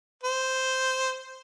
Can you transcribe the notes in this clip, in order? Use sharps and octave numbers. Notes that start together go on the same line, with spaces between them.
C5